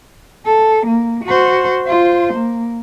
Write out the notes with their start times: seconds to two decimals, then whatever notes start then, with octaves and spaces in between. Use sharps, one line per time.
0.46 A4
0.86 A#3
1.25 F#4 C5
1.83 F4 C5
2.34 A#3